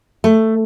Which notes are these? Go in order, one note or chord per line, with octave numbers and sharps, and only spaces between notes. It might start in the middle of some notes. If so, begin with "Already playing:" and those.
A3